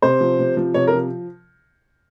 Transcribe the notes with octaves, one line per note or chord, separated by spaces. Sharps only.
C3 C5
F3
C3
F3
C3 C#5
A#4
F3